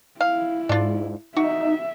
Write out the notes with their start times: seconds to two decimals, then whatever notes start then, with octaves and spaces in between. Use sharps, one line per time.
0.20 E4 F5
0.69 G#2 D4 F4
1.36 D#4 F#4 E5